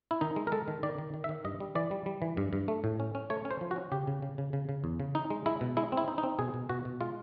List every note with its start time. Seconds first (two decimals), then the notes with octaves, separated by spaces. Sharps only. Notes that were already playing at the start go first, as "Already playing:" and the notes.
0.11 E4
0.21 D#3 D#4
0.36 G#3
0.47 A#4
0.52 G#3 A4
0.68 D#3
0.83 D#3 D5
0.98 D#3
1.14 D#3
1.24 E5
1.29 D#3
1.45 G2 D#5
1.60 G3
1.75 E3 D5
1.91 G3
2.06 G3
2.22 E3
2.37 G2
2.53 G2
2.68 A3
2.84 A2
3.00 C#4
3.15 C#4
3.30 A3 C#5
3.45 C#4
3.51 C5
3.61 F3
3.71 F#4
3.76 C#4
3.92 C#3 G4
4.07 C#3
4.22 C#3
4.38 C#3
4.53 C#3
4.69 C#3
4.84 E2
5.00 C#3
5.15 D#4
5.30 G#3
5.46 G#3 E4
5.61 B2
5.77 G#3 E4
5.92 C4
5.97 E4
6.08 D#4
6.18 D#4
6.23 C4
6.39 B2 G#4
6.54 B2
6.69 B2 F#4
6.85 B2
7.01 G#3 F4